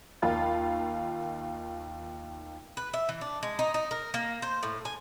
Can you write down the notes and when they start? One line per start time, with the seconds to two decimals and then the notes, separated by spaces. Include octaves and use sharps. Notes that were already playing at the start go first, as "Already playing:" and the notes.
0.22 D#2 D#3 F4 A5 B5 A6
2.77 B4
2.94 E5
3.09 E3
3.21 D4
3.43 G#3
3.59 D#4
3.74 D#4
3.91 A#4
4.14 A#3
4.42 C5
4.63 A2
4.85 G#5